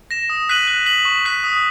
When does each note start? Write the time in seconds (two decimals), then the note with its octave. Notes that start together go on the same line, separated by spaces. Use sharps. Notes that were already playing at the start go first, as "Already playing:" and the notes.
0.11 A#6 E7
0.30 D#6
0.49 F#6 B6 D#7 F#7
0.67 F#6
0.86 B6 F#7
1.05 C#6
1.25 F#6 B6
1.44 D#6